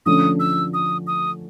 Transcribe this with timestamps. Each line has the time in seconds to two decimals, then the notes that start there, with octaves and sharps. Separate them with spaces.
0.06 D3 F3 A3 C#4 D#6
0.40 E6
0.74 D#6
1.07 D#6